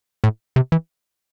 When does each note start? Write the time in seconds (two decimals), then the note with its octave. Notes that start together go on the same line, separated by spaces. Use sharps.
0.24 A2
0.56 C3
0.72 E3